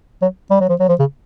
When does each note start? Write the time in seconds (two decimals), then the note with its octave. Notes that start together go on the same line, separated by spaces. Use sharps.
0.22 F#3
0.51 G3
0.61 F#3
0.69 F3
0.80 F#3
0.89 F3
0.99 C#3